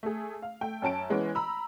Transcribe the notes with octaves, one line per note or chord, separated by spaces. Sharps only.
A3 G#4
F5
A3 G5
F#2 C#4 A5 D7
E3 G#3 B3 C#4
A#5 B5 E6